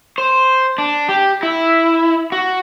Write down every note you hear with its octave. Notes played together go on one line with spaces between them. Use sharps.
C5
D4
G4
E4
F#4